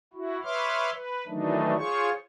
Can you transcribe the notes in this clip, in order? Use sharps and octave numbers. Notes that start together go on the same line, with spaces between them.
E4 F#4
B4 C#5 E5 C6 D6 F6
B4
D#3 E3 F#3 A3 D4 D#4
F4 G#4 C5 C#5 C#6